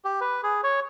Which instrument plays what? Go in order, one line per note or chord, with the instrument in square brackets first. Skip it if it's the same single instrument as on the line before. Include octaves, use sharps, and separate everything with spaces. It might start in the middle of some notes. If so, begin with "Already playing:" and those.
[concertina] G4
B4
G#4
C#5